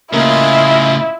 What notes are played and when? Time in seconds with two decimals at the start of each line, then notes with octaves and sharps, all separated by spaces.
0.13 A2 C#3 A#3 E4 F4 D#5